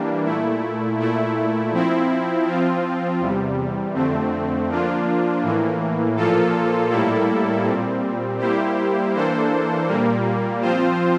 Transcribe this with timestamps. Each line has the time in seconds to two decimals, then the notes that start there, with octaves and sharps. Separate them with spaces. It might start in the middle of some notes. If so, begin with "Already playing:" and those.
Already playing: E3 G3 A#3 D4
0.25 A#2 A3 E4
0.98 A#2 A3 E4
1.72 F3 C4 E4
2.46 F3 C4 F4
3.20 E2 C3 G3
3.94 F2 D3 A3 C4
4.69 F3 A#3 D4 F4
5.43 A2 E3 A#3
6.16 A#2 F3 A#3 F4 A4
6.90 A2 G3 A#3 E4 A4
7.64 A#2 G3 C4
8.38 G3 A#3 E4 G4 C5
9.12 E3 A#3 D4 A4 C5
9.87 A#2 G3 A#3
10.61 F3 C4 F4 C5